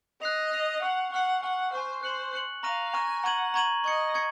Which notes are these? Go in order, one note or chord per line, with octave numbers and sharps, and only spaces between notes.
D#5 F#6 C7 F7
F#6 C7 F7
F#5 C#6 F6 C7
F#5 C#6 F6 C7
F#5 G#5 C#6 F6
C5 G#5 C#6 F6
C5 F#6 C#7 F#7
F#6 C#7 F#7
F5 A#5 C#6 F6 A#6 D#7
G#5 A#5 C#6 F6 A#6 D#7
F#5 A#5 C#6 G#6 D#7 F#7
A#5 C#6 G#6 D#7 F#7
D#5 C#6 G#6 C#7
C#6 G#6 C#7